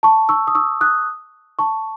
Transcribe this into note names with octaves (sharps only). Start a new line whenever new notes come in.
A5 C#6
C#6 E6
D#6
C#6 E6
D#6 F#6
A5 C#6